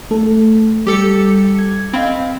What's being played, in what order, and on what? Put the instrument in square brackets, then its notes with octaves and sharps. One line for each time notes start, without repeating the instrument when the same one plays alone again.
[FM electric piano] A3 A4
[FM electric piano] G3 [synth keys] G4 A4 C#7
[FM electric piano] G#6
[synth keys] C4 [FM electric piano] D#5 F5 B5